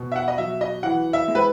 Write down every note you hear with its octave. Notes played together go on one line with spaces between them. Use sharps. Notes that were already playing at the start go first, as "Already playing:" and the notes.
Already playing: B2
E5
F#5
D#5
F#3 E5
D#5
E3 F#5
E5
G#3
B4